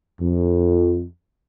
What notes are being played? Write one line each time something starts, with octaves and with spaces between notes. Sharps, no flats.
F2